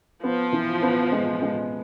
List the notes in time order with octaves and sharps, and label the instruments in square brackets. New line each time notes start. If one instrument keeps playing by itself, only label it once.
[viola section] F3 [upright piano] B3
[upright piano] E3
B3
G#3
G#3